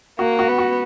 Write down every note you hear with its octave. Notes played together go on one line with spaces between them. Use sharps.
A#3 F#4
F#4
B3
F#4